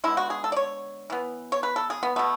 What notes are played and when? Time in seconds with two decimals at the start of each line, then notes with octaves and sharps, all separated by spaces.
0.04 D3 G#3 B3 E4
0.17 F#4
0.30 G#4
0.44 A4
0.52 D5
0.56 C#5
1.10 E3 B3
1.52 C#5
1.63 B4
1.76 A4
1.90 G#4
2.03 B3
2.16 B2 A3 B3